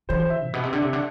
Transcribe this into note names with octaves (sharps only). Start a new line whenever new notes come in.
E3 C5
C5
E5
A2
B2
C3
D3
C3
D3